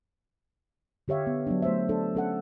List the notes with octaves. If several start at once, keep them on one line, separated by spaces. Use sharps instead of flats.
D3 G4 C#5 E5 F5
B3
F#3 B3 D4
A3 C5 E5
D4 A4
C#4 A4 F#5